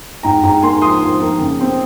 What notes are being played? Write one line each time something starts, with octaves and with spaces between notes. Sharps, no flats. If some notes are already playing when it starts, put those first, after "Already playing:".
G#2 G5 A#5
G#2 G5 A#5
A#3 G#5 C6
F3 C6 D#6
F3
A#3
C#3
C4